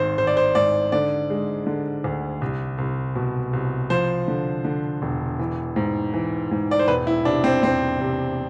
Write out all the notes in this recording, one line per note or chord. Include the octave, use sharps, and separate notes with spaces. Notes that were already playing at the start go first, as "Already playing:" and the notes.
Already playing: G#1 G#2 C5
G#1 C5
D5
C5
G#2 D5
D3 D5
G#3
D3
D2
C2
C2
B2
C2
F3 C5
D3
D3
E1
E3
G#2
E3
G#2
D5
C5
E1 B4
E4
C3 D4
C4
E1 C4
C3